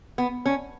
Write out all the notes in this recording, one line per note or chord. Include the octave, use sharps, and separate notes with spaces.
B3
C#4